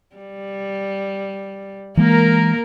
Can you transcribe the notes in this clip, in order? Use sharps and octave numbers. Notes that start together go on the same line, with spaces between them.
G3
E3 G#3 A#3 A#4